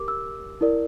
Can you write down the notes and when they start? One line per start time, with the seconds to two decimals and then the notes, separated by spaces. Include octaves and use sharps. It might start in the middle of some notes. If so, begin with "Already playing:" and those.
Already playing: G4 A#4 D6
0.08 E6
0.61 E4 A#4 D5